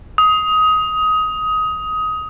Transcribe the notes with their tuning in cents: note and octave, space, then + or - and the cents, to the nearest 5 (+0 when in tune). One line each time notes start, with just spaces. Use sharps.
D#6 +20